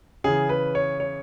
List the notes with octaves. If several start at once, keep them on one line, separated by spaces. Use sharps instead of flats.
C#3 E3 G#4
B4
C#5
C#5